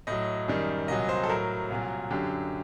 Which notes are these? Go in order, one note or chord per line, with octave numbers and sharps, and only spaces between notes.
A2 F#3 D#5
F#2 D#3 G3
C2 A#2 F#3 D#5
C5
A4
A2 F#3 A#4
C2 A#2 F#3
F#2 D3 F#3 G4